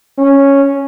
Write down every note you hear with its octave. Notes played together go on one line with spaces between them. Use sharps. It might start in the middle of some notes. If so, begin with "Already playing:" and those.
C#4